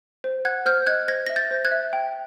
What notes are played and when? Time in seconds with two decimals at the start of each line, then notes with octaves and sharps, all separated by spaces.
0.24 C5
0.45 F#5 F#6 G#6
0.66 C5 F6 G6
0.87 D#5 F#6 G#6
1.08 C5 G#6 A#6
1.26 E5 A#6
1.36 G6 A6
1.51 C5
1.65 F#6 G#6
1.72 E5
1.93 G5